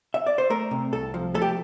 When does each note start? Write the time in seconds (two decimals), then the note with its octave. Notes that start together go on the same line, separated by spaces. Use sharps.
0.14 E5
0.26 D5
0.38 C5
0.50 A3 A#4
0.71 C3
0.93 C2 A4
1.14 F3
1.35 A3 A4
1.42 G4